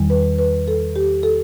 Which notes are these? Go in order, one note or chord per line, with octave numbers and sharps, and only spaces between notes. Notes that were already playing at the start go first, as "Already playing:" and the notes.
Already playing: E2 D#3 G3
B4
B4
A4
G4
A4